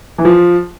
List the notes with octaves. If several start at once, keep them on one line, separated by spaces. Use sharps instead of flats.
E3
F3